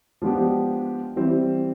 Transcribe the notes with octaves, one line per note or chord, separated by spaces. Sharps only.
F3 G#3 B3 D4 G4
E3 G3 C4 E4